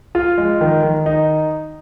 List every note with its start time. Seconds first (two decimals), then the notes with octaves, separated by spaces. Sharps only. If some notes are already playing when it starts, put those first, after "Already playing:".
0.15 F4
0.38 G#3
0.61 D#3
0.83 D#3
1.06 D#4